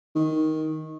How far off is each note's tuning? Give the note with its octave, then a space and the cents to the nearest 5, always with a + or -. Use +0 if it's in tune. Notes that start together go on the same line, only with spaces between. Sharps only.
D#3 +10